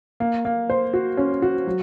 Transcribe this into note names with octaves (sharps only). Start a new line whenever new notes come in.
A#3
A#3
C5
F#4
C#4
F#4
F#3